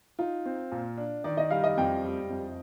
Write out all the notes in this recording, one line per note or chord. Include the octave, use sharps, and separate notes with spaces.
D#4 F4
C4
A#2
D4
D#3 D5
D#5
G3 F5
D#5
F2 G5
G3
F2